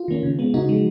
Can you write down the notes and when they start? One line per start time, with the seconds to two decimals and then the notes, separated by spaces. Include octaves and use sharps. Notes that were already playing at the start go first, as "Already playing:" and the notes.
Already playing: F4
0.08 D#3 A#3 C#4
0.23 C#3
0.39 G#3 B3
0.54 C#3 D#4 F#4
0.69 F3 G#3